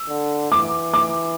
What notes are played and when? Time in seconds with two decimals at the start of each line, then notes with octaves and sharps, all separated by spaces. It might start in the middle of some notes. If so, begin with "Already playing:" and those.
Already playing: E6
0.09 D3
0.51 E3 D6
0.94 D6